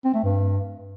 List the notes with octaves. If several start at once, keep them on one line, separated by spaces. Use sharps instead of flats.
C4
A3
G2